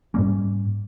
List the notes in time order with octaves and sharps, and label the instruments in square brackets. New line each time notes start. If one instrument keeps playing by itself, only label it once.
[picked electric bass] G#2 G3 A#3 C#4